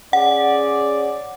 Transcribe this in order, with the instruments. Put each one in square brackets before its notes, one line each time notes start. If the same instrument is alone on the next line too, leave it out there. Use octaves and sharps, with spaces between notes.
[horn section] C#4 G#4 D5 [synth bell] F#5